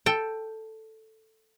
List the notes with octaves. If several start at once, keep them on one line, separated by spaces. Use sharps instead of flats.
A4 G5